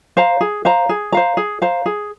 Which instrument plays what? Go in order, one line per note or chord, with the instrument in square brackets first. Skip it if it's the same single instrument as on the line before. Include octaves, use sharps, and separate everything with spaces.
[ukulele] C5 F5 A#5
G#4
C5 F5 A#5
G#4
C5 F5 A#5
G#4
C5 F5 A#5
G#4